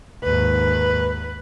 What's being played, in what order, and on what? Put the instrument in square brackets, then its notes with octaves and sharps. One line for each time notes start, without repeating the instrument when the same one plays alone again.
[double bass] D#2 G#2 [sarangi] B4